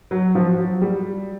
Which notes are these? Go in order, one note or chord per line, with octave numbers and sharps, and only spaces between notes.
F#3
F3
F#3
G3